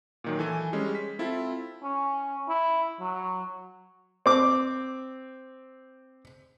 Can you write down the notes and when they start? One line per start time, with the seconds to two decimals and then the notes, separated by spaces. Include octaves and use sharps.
0.24 A#2 D#3 F#3
0.39 E3 A4 G#5
0.73 G3 G#3 C#4
0.95 B6
1.19 C4 E4 F4 A4
1.83 C#4
2.49 E4
3.00 F#3
4.26 C4 D6